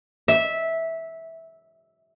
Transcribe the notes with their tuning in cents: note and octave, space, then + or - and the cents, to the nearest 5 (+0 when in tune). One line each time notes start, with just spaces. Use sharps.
E5 -10